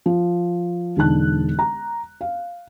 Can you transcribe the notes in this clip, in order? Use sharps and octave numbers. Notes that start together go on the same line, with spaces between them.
F3
E1 D3 D#4 A5 F#6
A#5
F5